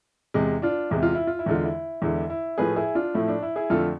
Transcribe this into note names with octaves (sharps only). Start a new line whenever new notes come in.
E2 C3 G#3
D4 F4
E2 C3 G#3 E4
F4
E4
F4
E4
E2 D3 G#3 F4
E4
E2 D3 G#3 E4
E4
A2 F3 A3 G#4 B4
E4 G#4
D4 F4
A2 F3 A3 E4
D4
E4
E4 G#4
F2 D3 A3 F4 A4